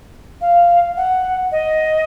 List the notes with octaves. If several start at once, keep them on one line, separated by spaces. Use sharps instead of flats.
F5
F#5
D#5